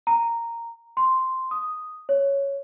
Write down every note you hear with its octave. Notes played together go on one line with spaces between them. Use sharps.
A#5
C6
D#6
C#5